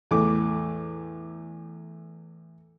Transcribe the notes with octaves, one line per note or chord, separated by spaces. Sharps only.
E2 A2 E3 D6